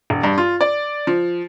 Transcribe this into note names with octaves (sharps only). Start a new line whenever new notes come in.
E1
G2
F4
D5
F3